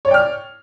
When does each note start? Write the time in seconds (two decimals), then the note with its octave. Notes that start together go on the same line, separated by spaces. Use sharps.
0.05 C#5
0.08 D5
0.11 G5
0.14 F6